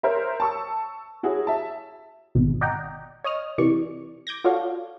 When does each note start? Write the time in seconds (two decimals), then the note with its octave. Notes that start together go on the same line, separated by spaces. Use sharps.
0.03 A#4 C5 C#5 E5
0.40 A5 C#6 E6
1.23 E4 F#4 G#4 C#5
1.47 E5 A5
2.35 G#1 B2
2.61 D5 D#5 F#5 G5 A#5
3.24 C#5 D#5 D#6 F6
3.58 C3 E3 D5 C#6
4.27 D6 G6 G#6 A#6
4.44 F4 F#4 A4 C#5 D5 F5